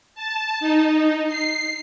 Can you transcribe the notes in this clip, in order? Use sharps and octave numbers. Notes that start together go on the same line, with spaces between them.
A5
D#4
C7